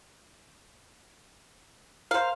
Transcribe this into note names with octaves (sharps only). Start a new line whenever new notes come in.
A#4 C5 F5